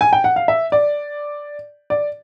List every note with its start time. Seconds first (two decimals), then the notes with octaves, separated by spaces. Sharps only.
0.01 G#5
0.13 G5
0.24 F#5
0.36 F5
0.48 E5
0.72 D5
1.90 D5